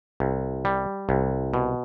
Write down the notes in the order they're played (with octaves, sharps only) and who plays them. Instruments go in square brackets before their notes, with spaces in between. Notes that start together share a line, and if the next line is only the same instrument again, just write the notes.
[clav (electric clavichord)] C2
G3
C2
B2